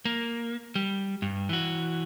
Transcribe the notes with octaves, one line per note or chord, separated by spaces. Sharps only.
A#3
G3
G2
E3 F#4